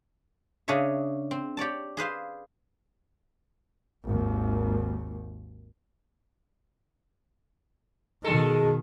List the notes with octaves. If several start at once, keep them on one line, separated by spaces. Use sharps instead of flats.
C#3 D4 G#4 C#5 E5
C4
G4 C#5 D5 A5
G#4 B4 C5 F5
G#1 D#2
B2 D#3 G#3 A4